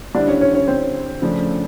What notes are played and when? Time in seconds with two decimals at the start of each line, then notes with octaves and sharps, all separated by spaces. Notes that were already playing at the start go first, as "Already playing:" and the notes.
0.14 D3 G3 C4 D4 E4 D5
0.27 C#4 C#5
0.41 C#4 C#5
0.54 C#4 C#5
0.68 C4 C5
1.22 C#3 F3 A3 D4